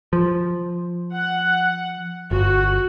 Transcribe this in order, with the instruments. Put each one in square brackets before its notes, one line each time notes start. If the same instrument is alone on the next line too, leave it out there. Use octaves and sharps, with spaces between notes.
[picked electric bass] F3
[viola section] F#5
[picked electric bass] G1 [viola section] F#4